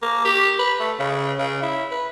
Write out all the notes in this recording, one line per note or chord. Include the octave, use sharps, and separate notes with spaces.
A#3
G4
B4
A3
C#3
C#3
E4
B4